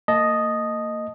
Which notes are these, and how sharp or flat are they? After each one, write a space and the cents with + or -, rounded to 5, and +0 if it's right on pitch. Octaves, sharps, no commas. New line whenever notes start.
A#3 -35 D#5 +0 A5 -15